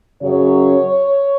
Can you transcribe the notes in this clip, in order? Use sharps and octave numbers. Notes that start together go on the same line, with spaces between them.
F#2 C#3 F#3 C#4 C#5